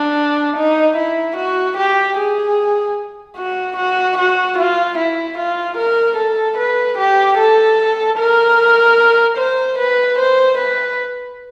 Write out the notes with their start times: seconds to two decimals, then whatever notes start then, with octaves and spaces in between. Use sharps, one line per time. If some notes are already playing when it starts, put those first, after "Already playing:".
Already playing: D4
0.57 D#4
0.97 E4
1.37 F#4
1.78 G4
2.18 G#4
3.37 F#4
3.77 F#4
4.18 F#4
4.58 F4
4.98 E4
5.38 F4
5.77 A#4
6.17 A4
6.58 B4
6.98 G4
7.38 A4
8.18 A#4
9.38 C5
9.79 B4
10.19 C5
10.59 B4